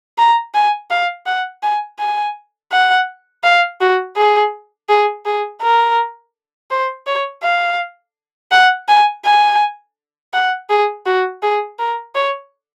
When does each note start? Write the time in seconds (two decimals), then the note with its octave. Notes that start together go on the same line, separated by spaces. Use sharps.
0.18 A#5
0.54 G#5
0.90 F5
1.26 F#5
1.63 G#5
1.99 G#5
2.72 F#5
3.44 F5
3.81 F#4
4.17 G#4
4.89 G#4
5.25 G#4
5.62 A#4
6.71 C5
7.07 C#5
7.43 F5
8.52 F#5
8.88 G#5
9.25 G#5
10.34 F#5
10.70 G#4
11.06 F#4
11.43 G#4
11.79 A#4
12.15 C#5